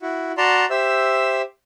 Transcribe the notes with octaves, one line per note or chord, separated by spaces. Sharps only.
E4 F#4
F#4 D5 A5 A#5 C6
G4 C5 E5 E6